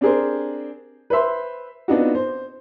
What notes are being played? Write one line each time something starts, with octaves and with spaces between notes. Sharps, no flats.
C4 D4 G4 G#4 A#4 C5
B4 C5 E5 C6
B3 C4 D4 D#4 F4 F#4
C5